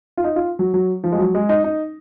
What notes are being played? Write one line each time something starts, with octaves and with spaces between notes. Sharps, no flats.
F4
D#4
F4
F#3
F#3
F3
G#3
F#3
G#3
D#4
D#4